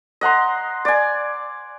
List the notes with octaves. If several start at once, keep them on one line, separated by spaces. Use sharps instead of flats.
D#5 F#5 A#5 C6
D5 G#5